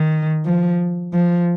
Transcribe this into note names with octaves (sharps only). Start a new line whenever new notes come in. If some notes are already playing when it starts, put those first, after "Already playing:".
Already playing: D#3
F3
F3